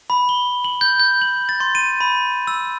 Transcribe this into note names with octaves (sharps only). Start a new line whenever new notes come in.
B5
G7
F#7
G6
G6
F#7
A6
C6
D#7
B5
E6